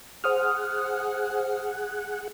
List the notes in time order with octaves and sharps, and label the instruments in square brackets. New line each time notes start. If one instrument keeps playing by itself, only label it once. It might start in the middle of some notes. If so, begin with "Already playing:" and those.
[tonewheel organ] G#4 F#5 [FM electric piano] C5 D#6 F6